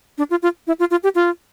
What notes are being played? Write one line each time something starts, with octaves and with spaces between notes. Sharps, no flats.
D4
F4
F4
E4
F4
F4
G4
F4